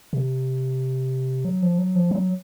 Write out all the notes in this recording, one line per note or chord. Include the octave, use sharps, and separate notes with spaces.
C3
F#3
F3
F#3
F3
F#3